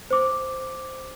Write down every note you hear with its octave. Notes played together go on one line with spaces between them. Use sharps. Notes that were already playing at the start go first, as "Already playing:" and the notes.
C5 D6